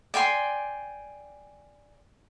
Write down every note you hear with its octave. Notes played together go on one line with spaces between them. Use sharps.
D5 G5 G#5 C6